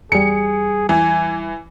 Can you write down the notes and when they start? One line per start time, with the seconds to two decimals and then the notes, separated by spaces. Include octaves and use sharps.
0.12 E2 G3 G#4 C#7
0.89 E3 G#5